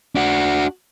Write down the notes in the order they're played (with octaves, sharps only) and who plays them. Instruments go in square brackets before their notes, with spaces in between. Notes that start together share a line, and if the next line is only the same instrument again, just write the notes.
[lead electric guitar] D4 F#4